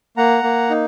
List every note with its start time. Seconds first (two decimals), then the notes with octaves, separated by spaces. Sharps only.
0.17 A#3 F#5 A#5
0.43 A#3
0.70 D#4